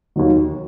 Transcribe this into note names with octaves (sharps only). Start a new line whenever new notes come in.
D#2 D#3 F#3